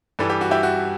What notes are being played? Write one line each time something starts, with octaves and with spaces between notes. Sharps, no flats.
G2 E3 G3 A4
G4
F#4
E4 G4
F#4